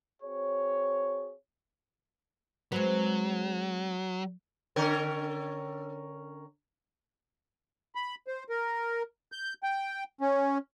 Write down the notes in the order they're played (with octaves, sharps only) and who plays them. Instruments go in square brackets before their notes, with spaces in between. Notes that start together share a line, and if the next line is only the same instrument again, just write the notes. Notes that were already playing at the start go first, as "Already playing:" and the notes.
[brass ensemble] C4 F#4 G#4 C#5
[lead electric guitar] F#3 [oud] G#3 C4 B4
[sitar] D3 C#4 A#4
[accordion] B5
C5
A#4
G6
G5
C#4